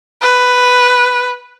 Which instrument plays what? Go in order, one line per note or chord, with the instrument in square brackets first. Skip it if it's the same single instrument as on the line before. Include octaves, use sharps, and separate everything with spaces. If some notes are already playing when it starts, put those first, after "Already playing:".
[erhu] B4